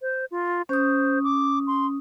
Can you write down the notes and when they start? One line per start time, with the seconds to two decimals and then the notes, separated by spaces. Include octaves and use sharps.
0.02 C5
0.31 F4
0.69 C#4 C5 D#6
1.24 D6
1.67 C6